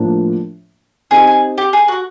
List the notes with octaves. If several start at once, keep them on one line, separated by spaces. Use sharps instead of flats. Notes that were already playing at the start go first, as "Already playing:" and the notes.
Already playing: A2 F3 A#3 D4
C4 D#4 G4 G#4
G#4
G4
G#4
F#4